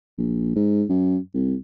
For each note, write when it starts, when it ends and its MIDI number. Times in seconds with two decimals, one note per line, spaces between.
0.18 0.53 34
0.56 0.84 44
0.89 1.17 42
1.34 1.55 36